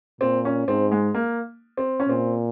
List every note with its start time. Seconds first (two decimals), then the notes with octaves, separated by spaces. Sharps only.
0.21 A#2 C4
0.45 C#4
0.68 G#2 C4
0.91 G#3
1.14 A#3
1.77 C4
2.00 C#4
2.09 A#2 C4